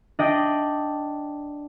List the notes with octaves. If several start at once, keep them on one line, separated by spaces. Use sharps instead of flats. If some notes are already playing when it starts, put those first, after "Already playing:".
D4 D#5 G5